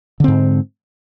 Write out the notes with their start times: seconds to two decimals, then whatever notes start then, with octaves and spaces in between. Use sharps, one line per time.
0.20 D3
0.24 C4
0.28 G#2